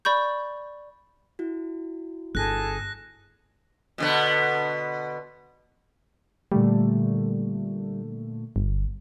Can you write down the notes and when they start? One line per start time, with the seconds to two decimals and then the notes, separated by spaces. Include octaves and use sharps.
0.05 D5 B5 C#6 G6
1.39 E4 F#4
2.35 G1 G#4 A4 F#6 A#6
3.98 B2 D3 B3
6.52 A#2 D3 G3 A3
8.56 G1